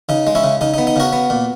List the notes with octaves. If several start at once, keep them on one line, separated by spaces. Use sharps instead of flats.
C#3 D#4
G#3
C#4 E4
C#3
C#3 D#4
D#4
B3
D#4
C#3 F#4 A#4
B3
A#2